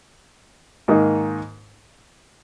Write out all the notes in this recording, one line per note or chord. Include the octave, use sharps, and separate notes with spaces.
G#2 D#3 A#3 D#4